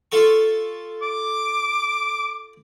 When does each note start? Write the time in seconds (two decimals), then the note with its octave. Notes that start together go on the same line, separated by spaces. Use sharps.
0.12 F4 A4 C#6
1.02 D6